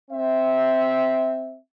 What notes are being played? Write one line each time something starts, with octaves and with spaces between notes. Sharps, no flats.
C4 E5